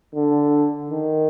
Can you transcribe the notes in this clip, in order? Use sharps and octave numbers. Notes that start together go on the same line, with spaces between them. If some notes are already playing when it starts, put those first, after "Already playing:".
D3
D#3